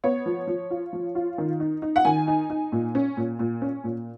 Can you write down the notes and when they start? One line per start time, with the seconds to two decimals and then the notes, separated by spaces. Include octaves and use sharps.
0.04 B3 C#5
0.26 F3
0.47 F3
0.70 F4
0.93 F3
1.15 F4
1.38 D#3
1.60 D#4
1.82 D#4
1.96 F#5
2.05 D#3 G#5
2.27 D#4
2.50 D#4
2.72 A#2
2.95 C#4
3.17 A#2
3.39 A#2
3.62 C#4
3.84 A#2